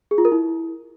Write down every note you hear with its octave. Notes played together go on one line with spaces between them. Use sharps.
G#4
F4
A#4
E4